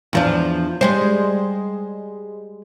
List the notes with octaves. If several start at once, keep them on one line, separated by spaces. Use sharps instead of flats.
E2 F3 D4
G3 G#3 C5